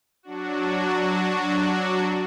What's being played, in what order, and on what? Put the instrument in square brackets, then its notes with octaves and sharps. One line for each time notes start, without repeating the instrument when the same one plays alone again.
[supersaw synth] F#3 D4 F#4